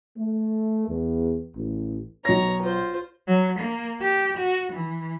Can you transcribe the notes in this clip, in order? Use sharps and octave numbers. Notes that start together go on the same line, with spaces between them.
A3
E2
A1
B1 C#5 A#5 A#6
F4 C5
F#3
A#3
G4
F#4
E3